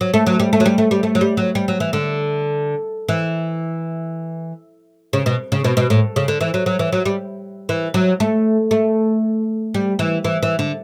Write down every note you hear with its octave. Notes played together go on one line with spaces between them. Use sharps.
F#3
A3
F#3
G3
A3
F#3
G3
A3
G3
A3
F#3
G3
F#3
G3
F#3
E3
D3
E3
C#3
B2
C#3
B2
B2
A2
C#3
D3
E3
F#3
F#3
E3
F#3
G3
E3
F#3
A3
A3
G3
E3
E3
E3
D3